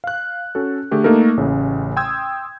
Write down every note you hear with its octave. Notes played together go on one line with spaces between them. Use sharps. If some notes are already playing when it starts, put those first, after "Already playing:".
F5 F#6
C#4 F#4 A4
D3 A3 G4 G#4
A3 A#3 D#4 A4 A#4
A1 A2 C#3
G5 C6 D#6 E6 G6 G#6